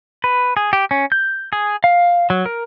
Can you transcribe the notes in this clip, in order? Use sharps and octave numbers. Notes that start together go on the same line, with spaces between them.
B4
G#4
G4
C#4
G6
G#4
F5
F#3
A#4